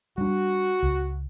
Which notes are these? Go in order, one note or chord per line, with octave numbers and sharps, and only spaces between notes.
G3 D4 F#4
C#2